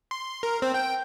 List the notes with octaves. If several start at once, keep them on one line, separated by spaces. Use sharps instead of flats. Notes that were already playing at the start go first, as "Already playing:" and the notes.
C6
A#4
C4
G5